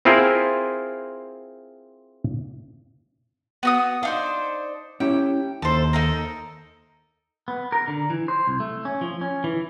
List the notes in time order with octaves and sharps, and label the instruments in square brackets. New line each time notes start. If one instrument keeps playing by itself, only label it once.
[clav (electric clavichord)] C4 E4 F4 G#4 A#4 C5
[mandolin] B3 F#4 D#6
[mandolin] D4 D#4 C5 [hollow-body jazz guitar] F5
[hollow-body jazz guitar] C#4 E4 G4 [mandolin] G5
[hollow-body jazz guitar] D#2 [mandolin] A4 C5
[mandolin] D#4 A4 A#4
[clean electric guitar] B3
A#4
D3
E3
C5
C2
A3
C#4
F3
C#4
E3